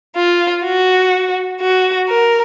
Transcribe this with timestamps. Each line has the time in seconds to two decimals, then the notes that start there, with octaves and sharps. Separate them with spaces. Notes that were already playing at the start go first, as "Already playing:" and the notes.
0.16 F4
0.64 F#4
1.61 F#4
2.08 A#4